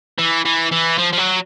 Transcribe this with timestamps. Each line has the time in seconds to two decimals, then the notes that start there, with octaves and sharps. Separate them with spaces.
0.19 E3
0.45 E3
0.72 E3
0.98 F3
1.13 F3
1.18 F#3